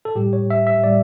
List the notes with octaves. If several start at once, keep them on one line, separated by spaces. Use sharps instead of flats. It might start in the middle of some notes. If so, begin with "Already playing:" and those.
A4
A2 G3 G4
C#5
E5
E5
A2 G3 D5